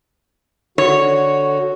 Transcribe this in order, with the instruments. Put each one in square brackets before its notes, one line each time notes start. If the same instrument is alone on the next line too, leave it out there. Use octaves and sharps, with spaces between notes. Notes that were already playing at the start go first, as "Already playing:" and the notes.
[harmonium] D3 F#4 [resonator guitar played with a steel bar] C#5